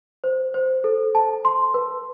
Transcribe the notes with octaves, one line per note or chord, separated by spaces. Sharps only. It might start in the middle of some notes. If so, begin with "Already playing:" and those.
C5
C5
A4
A5
C6
B4